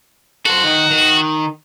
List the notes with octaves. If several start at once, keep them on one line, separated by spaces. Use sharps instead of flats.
F#4 A4 C5
D#3 D#4
D#3